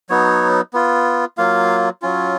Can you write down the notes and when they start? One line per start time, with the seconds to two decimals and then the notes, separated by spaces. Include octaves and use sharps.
0.10 F#3 B3 D#4 C#5
0.73 B3 F4
1.38 F#3 A#3 F4 F5
2.02 F#3 C#4 F4